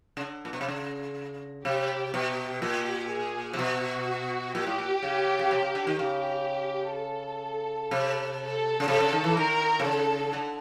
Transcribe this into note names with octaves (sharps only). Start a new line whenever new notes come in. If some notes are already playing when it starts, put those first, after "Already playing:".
C#3
D3
A#2
B2
C3
C#3
C3 G4
B2 G4
A#2 G4
G#4
C3
B2 F#4
A#2 G4
A2
A#2
C#3
C#3
C3
C#3
D3
D#3
C#3 G4
A4
C3
A4
C#3
C3 A4
C#3
D#3
E3
D#3 A#4
C3
C#3 A4
D3